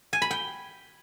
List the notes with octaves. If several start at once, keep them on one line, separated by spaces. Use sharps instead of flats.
G#5
B5
G5